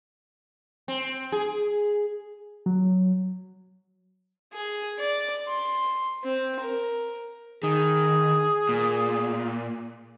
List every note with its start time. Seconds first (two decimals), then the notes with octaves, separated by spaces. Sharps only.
0.88 C4
1.32 G#4
2.66 F#3
4.53 G#4
4.99 D5
5.48 C6
6.24 C4
6.60 A#4
7.63 D#3 G#4
8.69 A#2